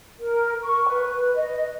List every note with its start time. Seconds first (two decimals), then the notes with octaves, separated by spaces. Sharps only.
0.20 A#4
0.63 C#6
0.88 B4
1.35 D#5